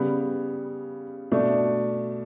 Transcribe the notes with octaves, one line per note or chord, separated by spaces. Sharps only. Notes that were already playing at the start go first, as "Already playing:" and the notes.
Already playing: C#3 G3 B3
B2 A3 D4